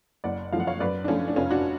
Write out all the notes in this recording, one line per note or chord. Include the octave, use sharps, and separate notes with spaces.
F#1 D5 F#5
F#2 F3 A3 F5
F#5
C#5 F5
F#2 B4 D5
D4
F3 A3 C#4 F4
D4
F1 C#4 F4
D4 F#4